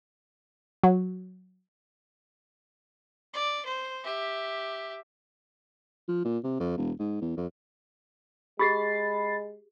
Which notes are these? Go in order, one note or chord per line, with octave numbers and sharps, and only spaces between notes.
F#3
D5
C5
G4 E5
F3
A#2
C3
F2
E1
G#2
E2
F2
G#3 G4 G#4 B5 A6 C7